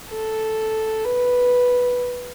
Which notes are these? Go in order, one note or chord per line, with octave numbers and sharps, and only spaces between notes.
A4
B4